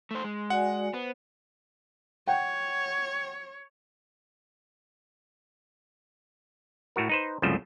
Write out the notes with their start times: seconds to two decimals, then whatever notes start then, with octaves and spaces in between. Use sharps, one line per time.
0.11 A3 C5
0.24 G#3
0.50 F#4 D5 F#5 G#5
0.94 B3 C5
2.27 C#5 F#5 G5
6.96 A2 A3 F#4 A#4
7.09 D#4 B4 C5
7.42 C2 F#2 C#3 F3 A3 C5